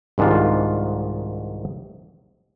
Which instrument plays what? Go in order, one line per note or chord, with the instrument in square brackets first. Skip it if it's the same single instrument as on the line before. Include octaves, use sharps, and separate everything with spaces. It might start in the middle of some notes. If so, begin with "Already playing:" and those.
[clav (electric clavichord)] C2 G#2 D#3 D4 F4